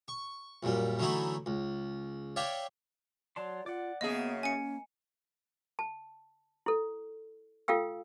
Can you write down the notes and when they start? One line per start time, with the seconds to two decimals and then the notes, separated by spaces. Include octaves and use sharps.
0.08 C#6
0.63 A#1 F#2 A#2 G3
0.99 D3 E3 F#3 A3 D#4 E4
1.46 C#2
2.36 C#5 D5 E5 F5 G5
3.36 F#3 D5 A5 C6
3.66 F4 D5 F#5
4.01 F#2 C#3 A#3 B3 G#4 D#5
4.43 C#4 G#5 C#7
5.79 A5
6.66 E4 A4
7.68 F4 A4 F5 G5 E6